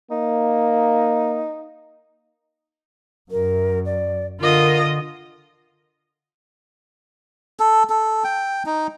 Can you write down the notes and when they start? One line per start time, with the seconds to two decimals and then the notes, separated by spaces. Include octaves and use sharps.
0.11 A#3 D#4
3.31 F#2 A#4
3.85 D5
4.41 D3 F4 A#4 D#5
7.60 A4
7.90 A4
8.24 G5
8.66 D#4